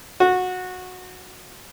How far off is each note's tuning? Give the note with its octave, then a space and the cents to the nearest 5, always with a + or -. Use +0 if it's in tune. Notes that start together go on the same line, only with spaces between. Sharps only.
F#4 -15